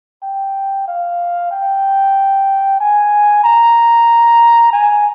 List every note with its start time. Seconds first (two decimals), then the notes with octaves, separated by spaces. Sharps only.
0.23 G5
0.88 F5
1.51 G5
2.80 G#5
3.44 A#5
4.73 G#5